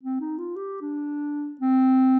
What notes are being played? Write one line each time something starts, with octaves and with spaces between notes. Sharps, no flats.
C4
D#4
F4
G4
D4
C4